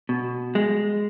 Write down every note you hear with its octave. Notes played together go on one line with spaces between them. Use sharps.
B2
G#3